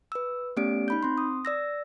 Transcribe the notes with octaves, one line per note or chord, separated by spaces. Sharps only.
B4 E6
A3 B3 C#4 G4 D5 D7
D#4 B5 G6
C4 C6
D#6
D5 E6 A#6